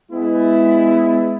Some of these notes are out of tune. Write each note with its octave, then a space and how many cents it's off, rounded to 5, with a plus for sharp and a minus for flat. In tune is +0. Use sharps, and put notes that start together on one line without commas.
G#3 +0 B3 +25 E4 +0